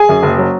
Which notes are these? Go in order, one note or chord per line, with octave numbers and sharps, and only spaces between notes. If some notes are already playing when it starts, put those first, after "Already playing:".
Already playing: G#4 G#5
F#2
F#1
F#3